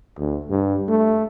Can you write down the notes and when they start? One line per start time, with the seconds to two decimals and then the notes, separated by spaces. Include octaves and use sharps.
0.19 D2
0.49 G2
0.88 A3